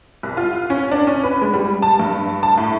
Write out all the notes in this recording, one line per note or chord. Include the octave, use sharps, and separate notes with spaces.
C2
F4
C#4
D4
C#4
B4
G#3
G3
A5
G2
A5
A2